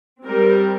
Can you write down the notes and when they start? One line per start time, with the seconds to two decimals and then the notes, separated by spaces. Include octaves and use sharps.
0.23 G3 C4 A#4